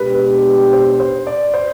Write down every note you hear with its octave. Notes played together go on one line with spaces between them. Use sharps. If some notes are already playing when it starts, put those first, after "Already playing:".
Already playing: B2 G#3 D4 G4 B4
B4
C5
C5
D5
C5